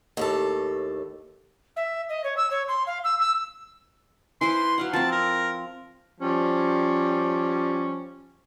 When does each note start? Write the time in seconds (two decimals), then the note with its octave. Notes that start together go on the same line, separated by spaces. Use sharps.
0.17 D#2 A2 A4
1.76 E5
2.09 D#5
2.24 C#5
2.37 E6
2.50 C#5
2.68 C6
2.86 F5
3.04 E6
3.20 E6
4.41 E3 B4 C5 C6
4.78 F#3 F5 F#5
4.93 F3 C4 A5
5.12 A#4
6.21 F3 G3 C#4